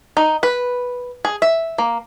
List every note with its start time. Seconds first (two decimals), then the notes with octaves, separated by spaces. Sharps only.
0.17 D#4
0.43 B4
1.25 G#4
1.42 E5
1.78 A#3